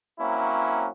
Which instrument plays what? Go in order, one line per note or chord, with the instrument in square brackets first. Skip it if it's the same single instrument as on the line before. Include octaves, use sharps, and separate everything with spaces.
[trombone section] F#3 A#3 C4 C#4 E4